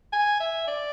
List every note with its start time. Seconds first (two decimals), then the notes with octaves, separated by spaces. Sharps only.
0.13 G#5
0.40 E5
0.68 D5